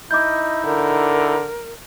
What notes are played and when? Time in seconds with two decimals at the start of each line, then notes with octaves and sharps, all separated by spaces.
0.11 D#4 E4 D#5 D6 G6
0.65 D3 A#4